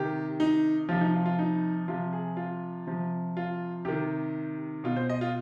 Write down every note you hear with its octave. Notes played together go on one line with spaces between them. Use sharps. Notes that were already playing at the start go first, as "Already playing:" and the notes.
Already playing: C3 D#3 G4
D#4
C3 F3 F4
D#4
F4
F4
D#4
C3 F3 F4
G#4
F4
C3 F3
F4
C3 D#3 G4
B2 F4
C5
D#5
F4